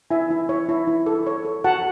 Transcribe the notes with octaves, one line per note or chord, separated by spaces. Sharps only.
E4 E5 G#5
E4
C#5
E4
E4
A4
C#5
A4
F#4 F#5 A5